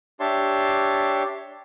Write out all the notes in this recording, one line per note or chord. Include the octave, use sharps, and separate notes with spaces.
D4 G4 C#5 E5 A5 C6